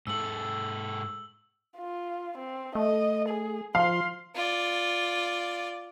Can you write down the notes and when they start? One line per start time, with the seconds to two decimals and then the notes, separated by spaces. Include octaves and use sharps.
0.07 G#2 G#3 A4 E6 F#7
1.78 F4
2.38 C4
2.75 A3 D#5
3.28 G#4
3.75 F3 F5 C6
4.35 F4 D5